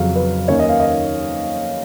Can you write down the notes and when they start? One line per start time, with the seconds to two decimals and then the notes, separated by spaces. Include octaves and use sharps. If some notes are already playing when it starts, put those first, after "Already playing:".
Already playing: F2 C#3 F#3 F5
0.15 B4
0.48 D#2 D#3 A#3 C#4 C#5
0.59 D#5
0.69 F5
0.80 D#5